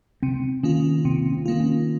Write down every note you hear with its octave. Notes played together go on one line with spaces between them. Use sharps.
C3 C4
D#3 A#3 C#4 F4
C3 C4
C4
D#3 A#3 F4
C#4